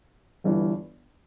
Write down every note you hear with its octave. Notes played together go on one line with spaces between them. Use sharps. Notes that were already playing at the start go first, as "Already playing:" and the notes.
G1 G2 E3